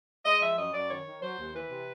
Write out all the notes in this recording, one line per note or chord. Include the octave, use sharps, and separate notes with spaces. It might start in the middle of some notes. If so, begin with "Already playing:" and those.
G#3 D#5
F3 E5
F#2 D#5
F#2 D5
D#3 C#5
D#3
F#3 C5
D#2
E3 B4
C3